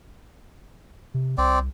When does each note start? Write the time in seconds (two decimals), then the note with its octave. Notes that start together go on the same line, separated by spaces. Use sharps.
1.14 C3
1.38 C2 C4 D5